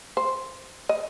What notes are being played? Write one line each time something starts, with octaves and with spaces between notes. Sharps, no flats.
C5
D#5